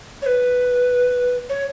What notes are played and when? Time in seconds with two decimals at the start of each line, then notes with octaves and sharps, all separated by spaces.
0.22 C#5
0.26 B4
1.49 C#5